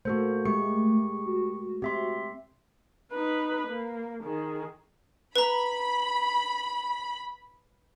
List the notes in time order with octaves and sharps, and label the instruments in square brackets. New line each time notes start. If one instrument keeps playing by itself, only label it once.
[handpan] A3 A#3 [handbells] F#4 A4 C5
[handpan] G#3 [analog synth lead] A3 [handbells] G4 C#6 C#7
[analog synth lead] F#4
[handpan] C4 [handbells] G4 E5 C6
[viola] D#4 B4
A#3
D#3 G#4
[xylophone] B4 A#5 [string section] B5